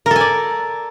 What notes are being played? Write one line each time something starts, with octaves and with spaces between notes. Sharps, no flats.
A4 A#4 D5 G#5